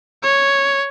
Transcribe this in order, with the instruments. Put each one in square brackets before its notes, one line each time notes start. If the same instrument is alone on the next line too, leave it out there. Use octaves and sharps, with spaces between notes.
[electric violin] C#5